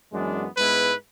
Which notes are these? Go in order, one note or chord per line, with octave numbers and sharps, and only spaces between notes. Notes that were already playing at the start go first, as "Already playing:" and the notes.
F#2 E3 G#3 B3 D4
G#2 G#3 B3 E4 B4